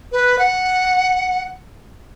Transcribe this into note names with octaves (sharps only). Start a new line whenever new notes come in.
B4
F#5